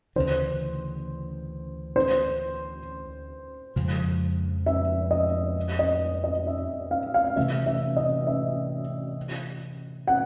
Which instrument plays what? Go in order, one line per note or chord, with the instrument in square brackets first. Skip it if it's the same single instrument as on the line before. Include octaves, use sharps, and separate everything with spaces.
[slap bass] D2 C#3 E3 [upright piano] C5
[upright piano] C5
[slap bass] F2 C#3 F3 G#3
[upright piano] E5
D#5
D#5
D#5
E5
F5
F5
[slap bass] C3 E3 A3 C#4 [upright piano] E5
[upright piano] E5
D#5
E5
F#5